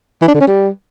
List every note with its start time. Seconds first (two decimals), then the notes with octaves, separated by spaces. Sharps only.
0.22 E3
0.28 D4
0.34 D3
0.41 C#4
0.47 G3